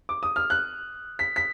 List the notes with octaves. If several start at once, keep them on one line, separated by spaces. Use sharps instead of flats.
D6
D#6
F6
F#6
B6
B6